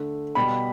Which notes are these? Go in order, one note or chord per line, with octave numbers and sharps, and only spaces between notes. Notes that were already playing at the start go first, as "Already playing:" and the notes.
Already playing: D3 A3
B2 G3 B3 B5